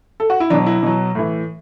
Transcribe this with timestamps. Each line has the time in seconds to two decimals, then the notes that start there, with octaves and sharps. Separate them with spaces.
0.20 A4
0.30 F#4
0.40 E4
0.50 F#3 D4
0.54 B2
0.66 E4
0.83 B2 F#3
1.15 A2 E3